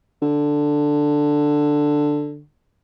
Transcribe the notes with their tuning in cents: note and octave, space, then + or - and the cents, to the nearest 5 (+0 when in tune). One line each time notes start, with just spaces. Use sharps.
D3 +5